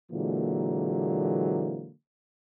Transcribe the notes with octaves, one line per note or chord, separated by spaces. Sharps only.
A#2 D3 E3 F#3 G#3 A#3